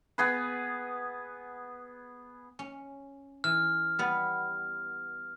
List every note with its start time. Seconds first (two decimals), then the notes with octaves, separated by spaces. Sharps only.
0.18 B3 G#4 B4
2.59 C#4
3.44 E3 F6
3.99 G3 B3